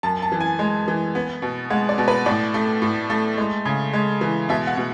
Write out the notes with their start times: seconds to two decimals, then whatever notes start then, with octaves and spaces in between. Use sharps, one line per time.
0.03 F#2 A5
0.22 A5
0.32 E3
0.41 G#5
0.59 G#3
0.88 E3
1.15 B3
1.42 B2
1.70 G#3 F#5
1.89 D5
1.98 B2
2.08 B4
2.26 A2 D5
2.54 A3
2.82 A2
3.10 A3
3.38 G#3
3.65 C#3
3.93 G#3
4.21 E3
4.49 B2 E5
4.67 F#5
4.77 B2